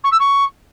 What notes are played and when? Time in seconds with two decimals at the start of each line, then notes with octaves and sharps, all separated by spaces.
0.04 C#6
0.11 E6
0.19 C#6